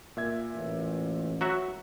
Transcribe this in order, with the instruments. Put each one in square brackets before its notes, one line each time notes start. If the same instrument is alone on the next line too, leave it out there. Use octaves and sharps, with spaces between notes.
[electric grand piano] A#2 E5 G#6
[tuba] A1
[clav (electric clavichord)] F#3 F#4 E5